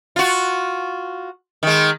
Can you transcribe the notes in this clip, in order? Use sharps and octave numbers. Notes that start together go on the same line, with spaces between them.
F4 F#4
D#3 G#3